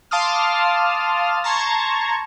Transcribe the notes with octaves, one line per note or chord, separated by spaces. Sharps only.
F5 A5 C6 D6 D#6 F6
A5 A#5 C6 C#6 G#6